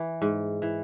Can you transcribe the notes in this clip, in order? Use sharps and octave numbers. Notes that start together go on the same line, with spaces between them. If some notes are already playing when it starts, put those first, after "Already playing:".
Already playing: E3
G#2
E3